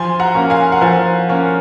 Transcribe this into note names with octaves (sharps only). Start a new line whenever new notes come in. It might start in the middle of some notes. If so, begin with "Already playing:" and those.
Already playing: F3 G#5 C6
F#5 A#5
A#3 C#4
F5 G#5
F#5
F3 F5 G#5
A#3 C#4